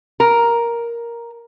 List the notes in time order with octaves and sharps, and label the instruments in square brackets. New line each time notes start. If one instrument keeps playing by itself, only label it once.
[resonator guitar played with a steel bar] A#4